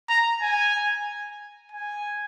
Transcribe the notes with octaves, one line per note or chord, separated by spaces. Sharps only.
A#5
G#5
G#5